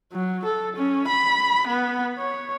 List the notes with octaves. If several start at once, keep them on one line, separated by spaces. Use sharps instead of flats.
F#3
A4
C#4
B5
B3
C#5